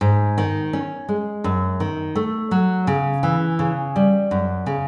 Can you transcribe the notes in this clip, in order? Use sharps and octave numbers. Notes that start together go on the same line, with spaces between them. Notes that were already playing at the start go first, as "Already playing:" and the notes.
G#2
D#3
C#4
G#3
F#2
D#3
A3
F#3
C#3
E3
C#3
G3
F#2
C#3